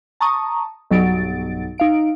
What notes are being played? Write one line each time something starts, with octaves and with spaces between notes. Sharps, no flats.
A5 A#5 C#6 D#6
B1 G2 F#3 D#4 A6 D7
D#4 F5 D7